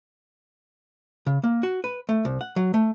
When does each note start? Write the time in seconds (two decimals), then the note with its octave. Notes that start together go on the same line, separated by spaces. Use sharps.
1.26 C#3
1.44 A#3
1.63 F#4
1.84 B4
2.09 A3
2.25 C2
2.41 F#5
2.56 F#3
2.74 A3